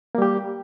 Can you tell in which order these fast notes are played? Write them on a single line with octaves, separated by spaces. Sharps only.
A#3 G3 G4